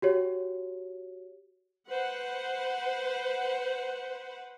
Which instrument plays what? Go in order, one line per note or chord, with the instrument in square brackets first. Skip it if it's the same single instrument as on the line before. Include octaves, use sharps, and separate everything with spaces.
[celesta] F#4 G4 C#5
[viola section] B4 C5 F#5